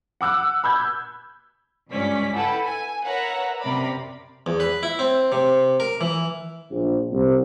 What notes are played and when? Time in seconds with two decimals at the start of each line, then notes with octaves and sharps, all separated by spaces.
0.21 F#5 D6 E6 F#6
0.64 B5 E6 G6 G#6
1.90 C#2 G2 C#4 D5 B6
2.33 E4 A4 B4 F#5 G5 A5
2.63 G#5
3.04 A#4 B4 C#5 E5 F#5 A#5
3.62 F#2 C3 A#4 D5 B5
4.46 E2
4.60 B4
4.83 E4
4.99 C4
5.32 C3
5.80 A#4
6.01 E3
6.70 A#1
7.11 C2